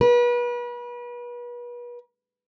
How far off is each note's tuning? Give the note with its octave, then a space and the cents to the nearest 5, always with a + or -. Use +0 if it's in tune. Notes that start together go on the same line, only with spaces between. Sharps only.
B4 -35